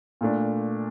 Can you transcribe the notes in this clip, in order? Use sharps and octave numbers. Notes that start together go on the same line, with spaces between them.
A#2 A3 D4